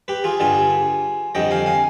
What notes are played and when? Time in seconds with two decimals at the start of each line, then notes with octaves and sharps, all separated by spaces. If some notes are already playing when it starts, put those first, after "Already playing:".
0.08 G4 B4
0.24 F4 G#4
0.40 G2 D3 G3 F4 G#4
1.35 F2 D3 G3 D#5 G5
1.51 F5 G#5
1.66 F5 G#5